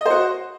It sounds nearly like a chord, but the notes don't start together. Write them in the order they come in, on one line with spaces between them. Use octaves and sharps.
D#5 C5 F#4